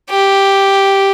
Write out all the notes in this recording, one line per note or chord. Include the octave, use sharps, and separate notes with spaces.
G4